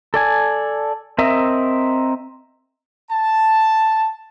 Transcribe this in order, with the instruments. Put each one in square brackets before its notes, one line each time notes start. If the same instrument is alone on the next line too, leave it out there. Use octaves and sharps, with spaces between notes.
[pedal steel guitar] A4 D5 G#5
C4 A#4 D#5 E5
[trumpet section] A5